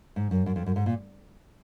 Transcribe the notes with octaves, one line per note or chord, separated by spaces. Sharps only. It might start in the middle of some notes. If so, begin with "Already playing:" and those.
G#2
F#2
F#2
F2
F#2
G#2
A#2